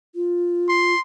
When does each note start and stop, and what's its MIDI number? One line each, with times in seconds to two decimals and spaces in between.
0.15 0.94 65
0.69 1.00 84